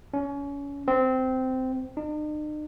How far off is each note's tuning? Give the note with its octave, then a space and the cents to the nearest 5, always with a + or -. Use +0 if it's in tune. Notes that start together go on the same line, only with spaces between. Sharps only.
C#4 +30
C4 -15
D#4 -45